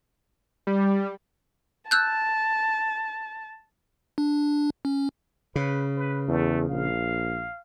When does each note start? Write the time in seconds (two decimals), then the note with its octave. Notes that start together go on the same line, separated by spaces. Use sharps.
0.67 G3
1.91 A5 E6 F#6 G6
4.18 D4
4.85 C#4
5.56 C#3 B4
5.96 B4
6.28 E2 A3
6.69 A#1 F5